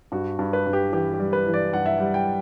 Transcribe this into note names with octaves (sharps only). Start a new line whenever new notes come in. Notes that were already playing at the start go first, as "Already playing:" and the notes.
G2 F#4
G2
B4
G2
G4
E3 G4
G4
G3
B4
E3
D5
G2 F#5
E5
G3 F#5
G5